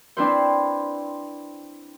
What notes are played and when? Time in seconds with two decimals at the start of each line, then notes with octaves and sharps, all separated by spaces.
0.17 C4 D4 E4 B4 C5